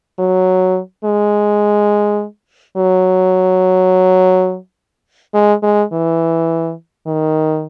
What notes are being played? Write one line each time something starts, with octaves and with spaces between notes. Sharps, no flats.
F#3
G#3
F#3
G#3
G#3
E3
D#3